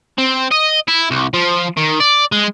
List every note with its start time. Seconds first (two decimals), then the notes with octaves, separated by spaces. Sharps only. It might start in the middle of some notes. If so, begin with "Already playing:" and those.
0.18 C4
0.51 D#5
0.88 E4
1.11 C2
1.34 F3
1.77 D#3
2.00 D5
2.32 G#3